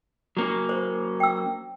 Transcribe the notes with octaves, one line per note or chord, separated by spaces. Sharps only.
F#3 A#3 C#4
C5
G5 E6